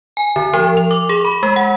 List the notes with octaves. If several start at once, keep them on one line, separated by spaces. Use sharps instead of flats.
G#5
D3
F3
F7
D6
G#4
B5
G#3
F#5